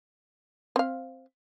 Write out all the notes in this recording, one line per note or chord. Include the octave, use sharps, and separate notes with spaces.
C4 F5